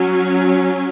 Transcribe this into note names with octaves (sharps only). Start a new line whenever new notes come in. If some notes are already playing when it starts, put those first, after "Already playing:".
Already playing: F#3 C#4